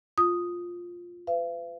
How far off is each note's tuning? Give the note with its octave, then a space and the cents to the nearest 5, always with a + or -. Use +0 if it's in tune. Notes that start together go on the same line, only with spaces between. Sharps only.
F4 +5 D#6 +0
B4 +40 F5 -45